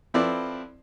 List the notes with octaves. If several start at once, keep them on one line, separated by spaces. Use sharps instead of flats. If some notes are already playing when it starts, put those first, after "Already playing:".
F3 C4 E4 A4 B4 D5